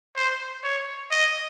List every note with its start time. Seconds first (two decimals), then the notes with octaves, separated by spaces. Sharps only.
0.16 C5
0.64 C#5
1.11 D#5